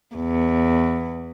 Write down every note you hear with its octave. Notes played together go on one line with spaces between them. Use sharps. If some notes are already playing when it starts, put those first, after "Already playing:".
E2